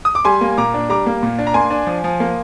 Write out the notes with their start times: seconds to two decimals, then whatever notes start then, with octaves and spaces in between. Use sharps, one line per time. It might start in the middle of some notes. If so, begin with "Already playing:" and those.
0.05 D#6
0.15 D6
0.25 G3 G#5 C6
0.41 A#3
0.58 A#2 A#5 D6
0.74 D4
0.89 G3 A#5 D6
1.06 A#3
1.23 A#2
1.39 D4
1.47 A#5
1.54 A#3 G#5 C6
1.70 D4
1.87 F3
2.04 F3
2.20 A#3